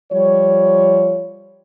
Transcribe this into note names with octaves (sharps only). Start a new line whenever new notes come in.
F3 G3 C#5